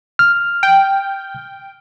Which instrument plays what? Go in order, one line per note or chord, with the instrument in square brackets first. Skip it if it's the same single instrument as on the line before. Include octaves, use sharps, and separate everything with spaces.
[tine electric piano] F6
[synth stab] G5